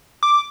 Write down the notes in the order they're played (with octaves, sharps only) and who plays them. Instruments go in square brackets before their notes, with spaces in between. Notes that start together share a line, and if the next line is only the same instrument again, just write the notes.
[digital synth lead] D6